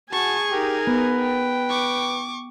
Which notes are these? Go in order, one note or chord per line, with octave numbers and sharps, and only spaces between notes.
F#4 G#4 G#5 A5 C#6
D#4 G4 A#4
B3 B4
G5
C#6 D6